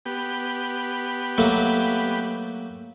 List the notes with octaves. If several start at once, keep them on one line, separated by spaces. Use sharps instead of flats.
B3 G4
F#3 A3 A#3